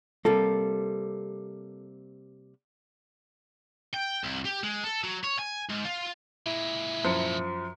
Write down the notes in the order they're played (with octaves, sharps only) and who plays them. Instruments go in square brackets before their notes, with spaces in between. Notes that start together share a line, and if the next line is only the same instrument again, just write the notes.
[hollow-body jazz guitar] C3 G3 A#3 [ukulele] A4
[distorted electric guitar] G5
C2
G4
G#3
A4
F#3
C#5
G#5
G#2
F4
[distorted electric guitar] A#2 G#3 [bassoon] E4
[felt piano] F#2 F3 C#7